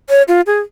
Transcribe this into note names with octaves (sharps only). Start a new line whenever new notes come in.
C#5
F4
G#4